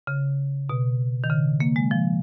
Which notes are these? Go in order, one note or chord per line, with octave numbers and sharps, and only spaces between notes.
C#3
B2
D#3
C#3
A#3
G#3
F3